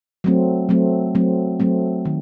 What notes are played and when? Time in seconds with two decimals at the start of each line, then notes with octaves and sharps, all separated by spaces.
0.24 F#3 A3 C4
0.69 F#3 A3 C4
1.15 F#3 A3 C4
1.60 F#3 A3 C4
2.05 D#3